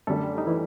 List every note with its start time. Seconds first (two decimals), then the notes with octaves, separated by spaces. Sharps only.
0.07 F#2 D3 G3 A3 A4
0.38 D#4
0.47 E3 E4